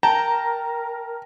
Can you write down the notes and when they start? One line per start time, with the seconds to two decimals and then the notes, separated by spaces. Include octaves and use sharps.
0.03 A#4 G5 A5 A#5